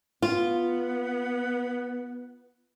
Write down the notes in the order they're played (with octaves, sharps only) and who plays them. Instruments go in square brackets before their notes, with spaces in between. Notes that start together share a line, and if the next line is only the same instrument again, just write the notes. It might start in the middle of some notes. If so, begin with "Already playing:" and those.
[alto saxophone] B3 [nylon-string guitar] F4